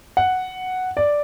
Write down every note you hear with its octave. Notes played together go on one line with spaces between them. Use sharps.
F#5
D5